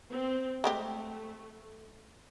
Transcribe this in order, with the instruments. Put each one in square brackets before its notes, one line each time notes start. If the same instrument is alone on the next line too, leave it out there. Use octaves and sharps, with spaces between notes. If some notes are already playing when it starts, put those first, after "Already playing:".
[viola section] C4
[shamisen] G#3 C4 G4 [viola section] A3